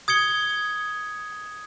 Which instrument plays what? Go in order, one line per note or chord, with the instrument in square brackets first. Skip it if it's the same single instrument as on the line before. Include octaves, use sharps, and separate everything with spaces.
[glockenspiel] D#6 G#6 C#7 G7